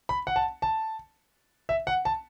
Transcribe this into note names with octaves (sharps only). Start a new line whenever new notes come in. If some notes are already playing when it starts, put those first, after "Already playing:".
B5
F#5
A5
A5
E5
F#5
A5